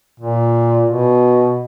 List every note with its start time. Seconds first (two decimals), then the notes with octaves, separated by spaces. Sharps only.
0.20 A#2
0.88 B2